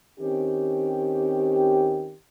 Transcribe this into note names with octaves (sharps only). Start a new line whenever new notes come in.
D#3 C4 C#4 G4